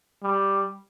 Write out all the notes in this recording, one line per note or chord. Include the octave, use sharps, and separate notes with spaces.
G3